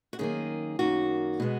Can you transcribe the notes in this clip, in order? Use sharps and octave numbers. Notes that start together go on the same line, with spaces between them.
F#4
F#2 D#3 A#3 G#4
F#2 D#3 A#3 F#4
B2 G#3 B3